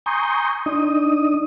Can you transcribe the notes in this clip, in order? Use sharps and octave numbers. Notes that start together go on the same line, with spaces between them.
G#5 A#5 C6 C#6 D#6 G6
D4 D#4 D#6